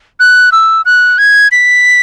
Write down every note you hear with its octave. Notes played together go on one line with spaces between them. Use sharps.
F#6
E6
F#6
G#6
B6